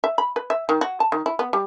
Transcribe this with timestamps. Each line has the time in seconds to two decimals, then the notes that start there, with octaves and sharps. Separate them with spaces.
0.04 E5
0.18 B5
0.36 B4
0.50 E5
0.69 D#3
0.81 F#4
1.00 A5
1.12 D#3
1.26 E4
1.39 B3
1.53 G3